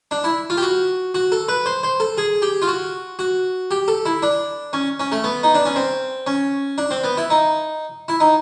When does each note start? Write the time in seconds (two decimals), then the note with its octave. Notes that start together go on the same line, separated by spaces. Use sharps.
0.11 D4
0.24 E4
0.50 F4
0.57 G4
0.63 F#4
1.14 F#4
1.32 A4
1.49 B4
1.66 C5
1.83 C5
2.00 A4
2.18 G#4
2.42 G4
2.62 F4
2.68 F#4
3.19 F#4
3.71 G4
3.88 A4
4.05 E4
4.22 D4
4.73 C#4
5.00 C#4
5.12 A3
5.24 B3
5.43 D#4
5.55 D4
5.66 C#4
5.76 C4
6.27 C#4
6.78 D4
6.91 C4
7.04 B3
7.17 E4
7.30 D#4
8.08 E4
8.20 D#4